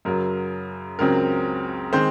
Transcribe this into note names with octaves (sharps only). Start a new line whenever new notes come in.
F#2 C#3 F#3 A#4
C#2 C#3 F#3 C4 A#4
D#3 G#3 C4 C5